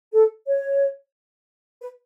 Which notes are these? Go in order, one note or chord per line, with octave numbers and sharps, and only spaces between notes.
A4
C#5
B4